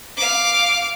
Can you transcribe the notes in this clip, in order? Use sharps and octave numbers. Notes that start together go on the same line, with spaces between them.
F5 D6